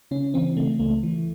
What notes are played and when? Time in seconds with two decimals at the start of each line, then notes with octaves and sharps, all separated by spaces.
0.11 C#3 C#4
0.34 E3 C4
0.57 C#3 A3
0.80 C#2 A3
1.03 E3